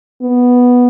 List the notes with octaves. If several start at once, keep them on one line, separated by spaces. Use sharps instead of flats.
B3